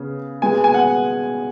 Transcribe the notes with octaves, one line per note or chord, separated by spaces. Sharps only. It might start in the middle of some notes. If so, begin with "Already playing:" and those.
Already playing: C#3 B3
B2 G#3 B3 G#5
G#5
F#5